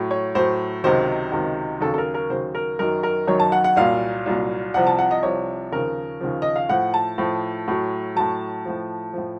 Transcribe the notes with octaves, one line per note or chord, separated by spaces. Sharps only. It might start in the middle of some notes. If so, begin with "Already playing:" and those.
Already playing: A2 F#3
C#5
A2 F#3 C5
C#2 C3 D#3 F#3 C5
C#2 C3 D#3 F#3
D#2 C#3 F#3 A4
A4
A#4
A#4
D#2 C#3 F#3 C5
A#4
F#2 D#3 F#3 A#4
A#4
F#2 D#3 F#3 C#5
A5
F#5
F#5
C2 A#2 F#3 F5
C2 A#2 F#3
C2 C3 F3 F#5
A5
F#5
D#5
C2 C3 F3 C#5
D#2 C#3 F3 A#4
D#2 C#3 F3
D#5
F5
A2 F3 F#5
A5
A2 F3
A2 F#3
A2 F#3 A5
A2 F3
A2 F3